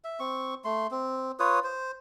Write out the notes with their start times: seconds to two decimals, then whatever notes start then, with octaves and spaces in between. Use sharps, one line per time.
0.04 E5
0.20 C4 C#6
0.65 A3 C6
0.91 C4
1.39 F4 B4 C#5 D#6
1.64 C5